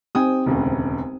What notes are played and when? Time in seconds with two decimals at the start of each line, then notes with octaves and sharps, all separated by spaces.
0.15 C4 D#4 G4 G5 G#5 D#6
0.46 E1 D2 C#3